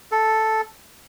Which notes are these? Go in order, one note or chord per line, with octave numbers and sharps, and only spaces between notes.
A4